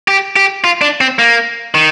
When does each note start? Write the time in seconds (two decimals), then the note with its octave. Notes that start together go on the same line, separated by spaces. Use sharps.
0.08 G4
0.36 G4
0.64 F4
0.82 D4
1.01 C4
1.19 A#3
1.75 D#3